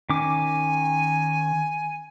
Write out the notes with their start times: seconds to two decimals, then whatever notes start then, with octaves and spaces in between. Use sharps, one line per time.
0.10 D#3 C#4 G#5 D6